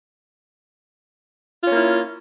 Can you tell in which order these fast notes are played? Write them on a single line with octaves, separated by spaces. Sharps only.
F4 C#4 A#3 E4